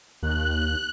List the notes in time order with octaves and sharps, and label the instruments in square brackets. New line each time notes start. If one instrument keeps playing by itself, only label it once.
[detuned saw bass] D#2 [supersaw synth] F#6